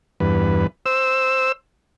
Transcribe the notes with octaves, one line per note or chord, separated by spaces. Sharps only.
E2 G2 B4
C5 E6